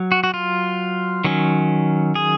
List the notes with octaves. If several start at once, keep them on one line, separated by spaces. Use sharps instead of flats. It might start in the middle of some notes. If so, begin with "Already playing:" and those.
Already playing: F#3
F#4
F#4
F4
D#3 F#3 C#4
G#4